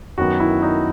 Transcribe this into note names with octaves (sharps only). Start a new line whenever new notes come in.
F#2 D#3 F#3 B3 F#4
E4
D#4